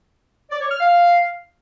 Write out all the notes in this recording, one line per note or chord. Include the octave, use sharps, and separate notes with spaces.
D5
C#5
F6
F5